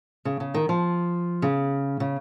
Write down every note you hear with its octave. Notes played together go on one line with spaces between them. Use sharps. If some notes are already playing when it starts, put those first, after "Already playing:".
C#3
C#3
D#3
F3
C#3
C#3